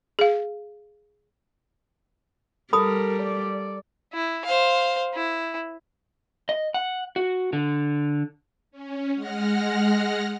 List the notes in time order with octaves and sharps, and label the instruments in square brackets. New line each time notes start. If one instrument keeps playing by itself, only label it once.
[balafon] G#4 F5
[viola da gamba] G3 [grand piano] A4 [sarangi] A#4 [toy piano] B5 D#6
[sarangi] D5
[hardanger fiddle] E4
C5 F5
E4
[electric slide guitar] D#5
F#5
F#4
D3
[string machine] C#4
G#3 F#5 F6 A#6